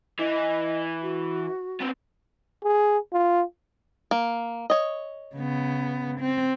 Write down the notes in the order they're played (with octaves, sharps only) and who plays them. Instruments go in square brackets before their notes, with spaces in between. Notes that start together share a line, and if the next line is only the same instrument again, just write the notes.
[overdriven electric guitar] E3 [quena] D#5
[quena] F#4
[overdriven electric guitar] B3 C4
[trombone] G#4
F4
[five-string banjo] A#3
C#5 D#5
[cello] C#3 B3
C4